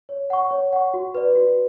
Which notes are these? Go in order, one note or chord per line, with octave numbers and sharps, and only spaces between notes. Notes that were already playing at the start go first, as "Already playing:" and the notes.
C#5
F#5 C#6
C#5
F#5 C#6
F#4
B4 D5
F#4